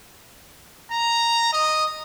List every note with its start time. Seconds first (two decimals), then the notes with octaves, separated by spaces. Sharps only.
0.92 A#5
1.53 D#5